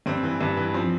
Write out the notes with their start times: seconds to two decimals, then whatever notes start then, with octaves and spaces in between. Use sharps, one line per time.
0.06 G2 C4
0.23 E3
0.41 G2
0.57 E3
0.74 F3 C4